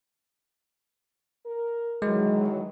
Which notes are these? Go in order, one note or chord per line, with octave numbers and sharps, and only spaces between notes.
A#4
D#3 E3 F#3 G#3